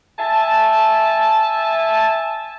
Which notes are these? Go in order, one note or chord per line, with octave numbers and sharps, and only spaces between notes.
E5 G#5 A5